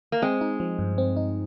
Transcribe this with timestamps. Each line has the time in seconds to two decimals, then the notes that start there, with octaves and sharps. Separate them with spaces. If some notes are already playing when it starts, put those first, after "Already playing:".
0.12 A#3
0.22 G#3 C4
0.41 D#4
0.60 F3
0.79 G2
0.98 C4
1.16 D#4